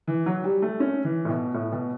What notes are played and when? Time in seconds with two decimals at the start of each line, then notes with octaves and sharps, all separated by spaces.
0.07 E3
0.26 F#3
0.44 G3
0.62 A3
0.80 C#4
1.04 E3
1.25 A2
1.29 B2
1.54 A2
1.72 B2